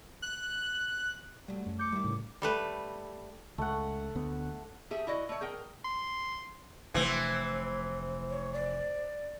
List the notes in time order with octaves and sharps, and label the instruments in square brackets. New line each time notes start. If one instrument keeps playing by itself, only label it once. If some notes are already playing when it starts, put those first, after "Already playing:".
[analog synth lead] F#6
[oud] F#3 A3 [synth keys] G3
[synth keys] F#2
[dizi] D6 [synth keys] G6 C#7
[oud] D#3 E4 [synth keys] G3
[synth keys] A2 C#3
[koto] G3 A3 B4
[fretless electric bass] C#2 [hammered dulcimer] A3 F#5
[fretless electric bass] D2 B3
[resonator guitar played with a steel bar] A3 G4 G#4 E5
E4 F#4 D5 D#5
A3 C#5
G#4 A#4 G5
[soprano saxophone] C6
[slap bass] F1 C3 A3 [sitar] E3 C4 [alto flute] C5
[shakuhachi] C#5
D5